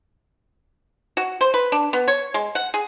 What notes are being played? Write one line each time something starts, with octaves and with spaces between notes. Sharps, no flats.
F#4
C5
B4
D4
B3
C#5
G#3
F#5
G#4